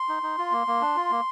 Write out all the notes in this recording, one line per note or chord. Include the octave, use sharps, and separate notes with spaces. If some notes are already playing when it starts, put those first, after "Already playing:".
Already playing: C6
D#4
D#4
F4
A#3
A#3
D4
F4
A#3